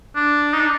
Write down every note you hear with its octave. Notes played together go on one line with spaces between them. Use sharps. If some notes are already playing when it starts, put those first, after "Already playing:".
D4
D#4
D4